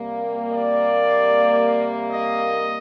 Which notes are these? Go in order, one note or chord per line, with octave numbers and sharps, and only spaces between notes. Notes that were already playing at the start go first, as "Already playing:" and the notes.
Already playing: C3 G3 A#3
D5
D#5